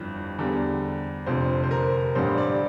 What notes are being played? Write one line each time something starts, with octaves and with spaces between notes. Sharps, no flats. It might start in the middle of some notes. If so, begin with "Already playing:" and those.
Already playing: G1 F2 E3 G3
E2 D3 G3
F1 F2 D3 C5
C5
A#4
A1 G2 D3 G3 C5
D5